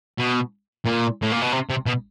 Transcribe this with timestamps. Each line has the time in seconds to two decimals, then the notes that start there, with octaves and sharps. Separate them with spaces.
0.18 B2
0.86 A#2
1.22 A2
1.32 A#2
1.42 B2
1.53 C3
1.70 C3
1.87 B2